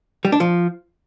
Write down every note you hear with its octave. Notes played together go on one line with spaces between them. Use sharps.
G3
D4
F3